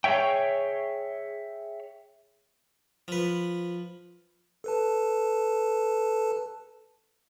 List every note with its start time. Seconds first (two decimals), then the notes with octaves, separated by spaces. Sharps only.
0.04 G#4 A#4 C#5 E5 G5
3.08 F3 B4
4.64 A4 B4 A5